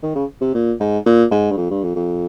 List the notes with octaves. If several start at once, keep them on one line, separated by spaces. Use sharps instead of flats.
D#3
C#3
C3
A#2
G#2
A#2
G#2
G2
F2
G2
F2
F2